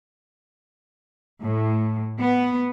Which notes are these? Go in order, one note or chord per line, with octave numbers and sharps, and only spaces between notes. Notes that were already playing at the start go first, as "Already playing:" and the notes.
A2
B3